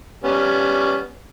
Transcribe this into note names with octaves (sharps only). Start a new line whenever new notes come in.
G3 B3 C#4